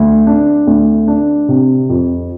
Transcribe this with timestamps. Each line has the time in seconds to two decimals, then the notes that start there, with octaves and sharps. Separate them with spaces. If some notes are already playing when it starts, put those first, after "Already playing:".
Already playing: D2
0.27 D4
0.67 D2
1.08 D4
1.49 C3
1.89 F2